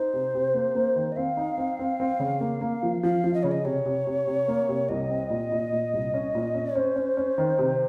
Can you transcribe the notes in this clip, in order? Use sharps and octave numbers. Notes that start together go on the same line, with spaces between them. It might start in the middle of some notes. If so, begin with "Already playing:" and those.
Already playing: D#4 C5
C3
C3
A#3
A#3
D#3
D#5
C4 F5
D#4
C4
C4
C4
C#3
A#3
A#3
F3
F3 F5
F3
D#5
C#3 C#5
D#5
C3 C#5
C3
C3
C3
A#3
C3
C2 D#5
C4
A#2
A#2
A#2
C2
C#4
A#2
C#4
C#4 C5
C#4
C#4
D#3
C3